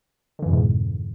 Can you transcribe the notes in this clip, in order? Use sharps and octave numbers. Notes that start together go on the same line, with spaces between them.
F2 G#2 B2 D3 E3